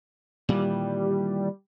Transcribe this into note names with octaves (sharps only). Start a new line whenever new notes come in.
A#2 D#3 E3 G3